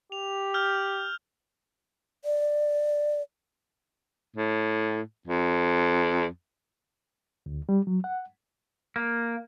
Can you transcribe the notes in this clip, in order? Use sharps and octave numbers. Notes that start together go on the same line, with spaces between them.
G4 F7
E6 F6 G6
D5
A2
F2
D2
G3
F#3
F#5
A#3